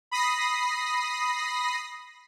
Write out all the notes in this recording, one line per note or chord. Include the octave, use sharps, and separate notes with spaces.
B5 D#6 A#6 C7